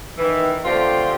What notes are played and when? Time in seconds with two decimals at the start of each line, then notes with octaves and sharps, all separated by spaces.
0.17 D#3 E3
0.64 D3 G3 A3 C4 F4 G4